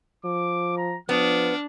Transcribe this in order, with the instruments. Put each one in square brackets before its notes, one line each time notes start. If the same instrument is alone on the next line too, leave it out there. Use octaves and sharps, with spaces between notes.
[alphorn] F3 [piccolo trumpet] D6
[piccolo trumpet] A#5
[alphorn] F3 [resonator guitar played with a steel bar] B3 [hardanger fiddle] D4 [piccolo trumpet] F6